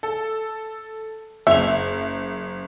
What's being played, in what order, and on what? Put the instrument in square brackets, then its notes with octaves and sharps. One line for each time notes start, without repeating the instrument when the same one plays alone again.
[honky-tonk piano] A4
[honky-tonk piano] F#1 F7 [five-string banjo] E5